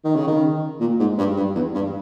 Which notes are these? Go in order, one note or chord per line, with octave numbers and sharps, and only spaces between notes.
D#3
C#3
D#3
A#2
G#2
G2
G2
E2
G2